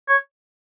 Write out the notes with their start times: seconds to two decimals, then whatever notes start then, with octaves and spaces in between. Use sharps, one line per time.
0.09 C#5